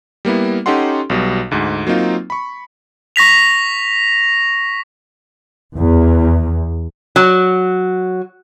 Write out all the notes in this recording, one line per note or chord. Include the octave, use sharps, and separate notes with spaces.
G3 A#3 B3 E4
C#4 D#4 G4 A4 F#5 C6
B1 B2 G3
D2 G#2
F#3 A#3 C4 D#4 F4
B5 C#6
C#6 A#6 B6 F7
E2
F#3